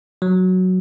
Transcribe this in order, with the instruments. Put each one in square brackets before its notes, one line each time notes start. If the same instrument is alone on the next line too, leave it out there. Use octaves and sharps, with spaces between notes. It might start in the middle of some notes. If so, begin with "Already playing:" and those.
[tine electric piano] F#3